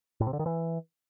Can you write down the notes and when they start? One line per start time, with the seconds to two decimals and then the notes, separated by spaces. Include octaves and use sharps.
0.20 A2
0.27 C3
0.33 D3
0.39 D#3
0.46 E3